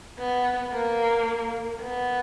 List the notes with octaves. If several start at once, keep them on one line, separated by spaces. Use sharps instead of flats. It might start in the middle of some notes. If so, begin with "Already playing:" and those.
B3
A#3
B3